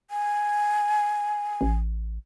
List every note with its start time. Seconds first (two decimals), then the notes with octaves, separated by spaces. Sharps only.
0.11 G#5
1.61 A1